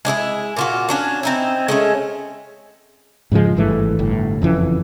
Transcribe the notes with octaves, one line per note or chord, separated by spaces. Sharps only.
G#3 D4 E4 G#4
A#2 F4 F#4
C#4 D4 F#4
C4 D#4 E4
G#3 A3 C#4
G#2 C#3 F3 G#3
G#1 G2 E3 A3
G1 A2
F#1 F2 E3 C#4